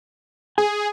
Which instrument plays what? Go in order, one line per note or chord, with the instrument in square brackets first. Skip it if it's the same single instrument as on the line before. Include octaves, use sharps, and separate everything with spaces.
[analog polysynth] G#4 [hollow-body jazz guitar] G#5